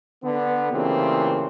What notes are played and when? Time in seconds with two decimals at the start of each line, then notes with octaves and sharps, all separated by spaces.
0.23 D3 B3
0.72 A#2 C#3 E3 A3 C4 G4